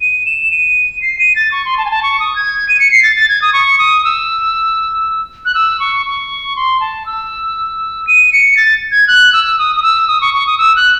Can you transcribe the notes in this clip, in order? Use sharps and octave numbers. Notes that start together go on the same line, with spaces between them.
D#7
E7
D#7
C7
D#7
A6
C#6
C6
A5
G#5
A5
C#6
D#6
G#6
D#7
C#7
C7
A6
A6
G#6
D#6
C#6
D#6
E6
F#6
E6
C#6
C#6
C6
A5
E6
D#7
C#7
A6
G#6
F#6
E6
D#6
D#6
E6
D#6
C#6
C#6
D#6
E6
F#6